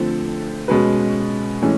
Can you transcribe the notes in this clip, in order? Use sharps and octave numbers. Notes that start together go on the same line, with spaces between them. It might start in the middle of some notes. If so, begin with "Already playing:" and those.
Already playing: D3 F3 A3 C4
B2 G#3 C#4 F#4 B4
A2 E3 G#3 C#4